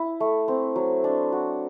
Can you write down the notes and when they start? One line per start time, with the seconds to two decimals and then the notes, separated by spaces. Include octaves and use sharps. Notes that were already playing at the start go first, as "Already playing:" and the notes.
Already playing: E4
0.20 A3
0.48 C4
0.76 F#3
1.04 D4
1.32 F#4